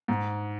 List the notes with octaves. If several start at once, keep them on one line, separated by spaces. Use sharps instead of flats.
G#2